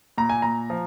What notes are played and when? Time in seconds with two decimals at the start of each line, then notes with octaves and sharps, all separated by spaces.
0.18 A#2 A#5
0.29 G#5
0.42 A#2 A#5
0.70 F3